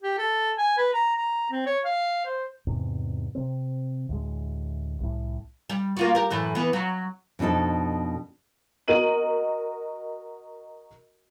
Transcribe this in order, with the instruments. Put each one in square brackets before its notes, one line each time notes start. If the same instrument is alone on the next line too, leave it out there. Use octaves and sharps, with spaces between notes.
[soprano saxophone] G4
A4
G#5
B4
A#5
A#5
C4
C#5
F5
C5
[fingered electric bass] E2 G#2 C3
C3 C4
D2 A2 G#3
C2 A2
[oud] G3
A#3 F4 F#4
G4 A#4
F#2 A2 E3
E3 B3
F#3
[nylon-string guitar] F2 B2 D4 D#4 A4
[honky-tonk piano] F#4 A#4 D#5 D#7 F#7